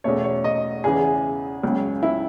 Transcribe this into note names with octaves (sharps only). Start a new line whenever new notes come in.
E2 B2 A3 C#4 C#5
C#5
D#5
E2 C#3 E3 G#4
C#2 C#3 F#3
E4